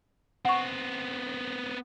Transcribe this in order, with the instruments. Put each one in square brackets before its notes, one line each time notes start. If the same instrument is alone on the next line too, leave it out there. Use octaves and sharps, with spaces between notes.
[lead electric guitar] B3 C4 [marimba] F#5 C#6